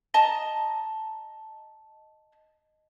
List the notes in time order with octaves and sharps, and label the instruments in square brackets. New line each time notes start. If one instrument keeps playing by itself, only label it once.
[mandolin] D#5 A5 A#5